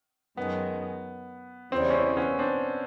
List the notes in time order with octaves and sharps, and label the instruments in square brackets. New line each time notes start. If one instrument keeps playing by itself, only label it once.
[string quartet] F#2 D#3 G#3 [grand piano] B3
[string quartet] E2 C#3 E3 G3 [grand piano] C4
[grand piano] C#4
C4
B3 C#4
C4 D4